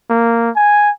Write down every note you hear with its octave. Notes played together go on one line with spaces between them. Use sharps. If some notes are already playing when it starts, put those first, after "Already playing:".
A#3
G#5